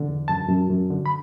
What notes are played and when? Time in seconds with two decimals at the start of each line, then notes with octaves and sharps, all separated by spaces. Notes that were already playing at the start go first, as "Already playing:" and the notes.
Already playing: D3
0.08 E2
0.28 F#2 A5
0.49 F#2
0.70 F#2
0.90 D3
1.06 B5